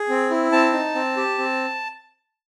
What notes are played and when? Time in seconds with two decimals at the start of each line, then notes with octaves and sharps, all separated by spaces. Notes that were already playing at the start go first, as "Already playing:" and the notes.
Already playing: G#4
0.09 C4
0.30 E4
0.52 C4 A5
0.73 D#4
0.95 C4
1.17 G4
1.38 C4